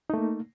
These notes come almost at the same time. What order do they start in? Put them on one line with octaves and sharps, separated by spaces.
D#4 A3 A#3